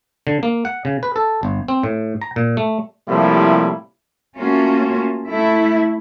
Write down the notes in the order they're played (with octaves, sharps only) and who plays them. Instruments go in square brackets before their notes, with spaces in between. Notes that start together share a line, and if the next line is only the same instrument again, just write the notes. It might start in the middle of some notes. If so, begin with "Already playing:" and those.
[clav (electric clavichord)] D3
A#3
F#5
C#3
B4
A4
G1
C4
A2
A#5
A#2
A3
[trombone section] A2 C3 F3 G3 A#3 E4
[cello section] A3 A#3 C#4 F4 F#4
A3 E4